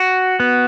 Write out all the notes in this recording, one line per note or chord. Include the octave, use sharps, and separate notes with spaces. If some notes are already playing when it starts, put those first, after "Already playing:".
Already playing: F#4
B3